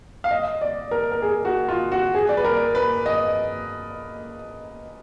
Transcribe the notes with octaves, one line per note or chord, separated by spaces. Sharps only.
F5
D#5
D5
A#4
A#4
G#4
F#4
F4
F#4
G#4
D5
B4
A#4
B4
D#5